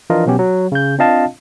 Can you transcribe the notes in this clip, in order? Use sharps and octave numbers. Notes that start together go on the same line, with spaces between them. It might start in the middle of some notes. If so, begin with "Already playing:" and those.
E3 F3 D4 F4 A#4 D#5
B2 F#3 B3 C#4 G4
F#3
C#3 G6
C4 D4 F4 D#5 F5 A5